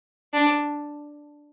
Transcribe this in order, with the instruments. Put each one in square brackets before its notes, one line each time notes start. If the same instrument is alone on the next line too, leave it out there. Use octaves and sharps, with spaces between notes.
[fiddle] D4